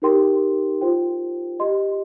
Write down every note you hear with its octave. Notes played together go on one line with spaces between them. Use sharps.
D#4 G4 A#4 G5 C6
F4 C5 G5
G4 D#5 C6